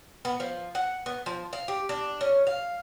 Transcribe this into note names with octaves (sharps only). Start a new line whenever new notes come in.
B3
F3
F#5
B3
F3
F5
G4
D4
C#4
F5